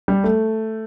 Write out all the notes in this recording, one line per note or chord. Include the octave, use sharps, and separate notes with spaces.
G3
A3